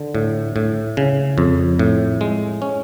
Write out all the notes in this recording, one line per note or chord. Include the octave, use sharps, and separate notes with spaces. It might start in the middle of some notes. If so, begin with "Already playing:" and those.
Already playing: D3
A2
A2
C#3
F2
A2
G#3
C#4